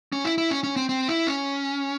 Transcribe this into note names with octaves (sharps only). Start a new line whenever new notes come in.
C#4
E4
E4
C#4
C#4
C4
C4
E4
C#4